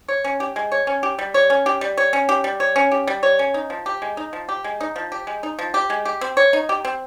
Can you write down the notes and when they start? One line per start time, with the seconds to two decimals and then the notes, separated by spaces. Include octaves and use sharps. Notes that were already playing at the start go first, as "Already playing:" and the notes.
0.08 C#5
0.24 C#4
0.40 G4
0.56 G#3
0.72 C#5
0.87 C#4
1.03 G4
1.19 G3
1.34 C#5
1.50 C#4
1.66 G4
1.81 G3
1.97 C#5
2.13 C#4
2.29 G4
2.44 G3
2.60 C#5
2.76 C#4
2.91 G4
3.07 G3
3.23 C#5
3.39 C#4
3.54 D#4
3.70 F3
3.86 G4
4.02 G#3
4.17 D#4
4.33 F3
4.49 G4
4.64 G#3
4.81 D#4
4.96 F3
5.12 G4
5.27 G#3
5.43 D#4
5.59 F3
5.74 G4
5.90 G#3
6.05 G4
6.21 C4
6.37 C#5
6.53 D#4
6.69 G4
6.85 C4